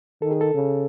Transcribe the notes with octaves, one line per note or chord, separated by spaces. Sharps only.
D#3 A4
G#4
A4
C#3